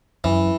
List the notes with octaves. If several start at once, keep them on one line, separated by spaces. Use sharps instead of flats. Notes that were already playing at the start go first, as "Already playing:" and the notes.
F#2 E3